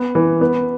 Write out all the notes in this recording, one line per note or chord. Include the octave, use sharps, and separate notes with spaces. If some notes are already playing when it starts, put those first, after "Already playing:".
Already playing: B3
E3
B3